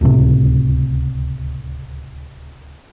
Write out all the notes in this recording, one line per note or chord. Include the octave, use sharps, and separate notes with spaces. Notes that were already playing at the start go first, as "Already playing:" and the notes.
D1 C#2 A2 C3